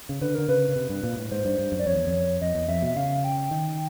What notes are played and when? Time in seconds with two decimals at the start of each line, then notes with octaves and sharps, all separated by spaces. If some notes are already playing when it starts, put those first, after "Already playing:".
0.09 C#3
0.21 D3 B4
0.35 D3 A#4
0.49 C#3 B4
0.69 C#3
0.76 C3
0.89 G2
1.03 A#2
1.17 A2
1.31 G#2 C5
1.45 G2
1.59 G2
1.72 F#2
1.79 D5
1.86 F2 C#5
1.96 E2
2.07 F2
2.41 F2 D#5
2.55 E2
2.68 F2 E5
2.82 B2 E5
2.97 C#3 F5
3.24 G5
3.51 D#3